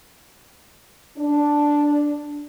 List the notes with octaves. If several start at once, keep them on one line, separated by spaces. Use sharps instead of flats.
D4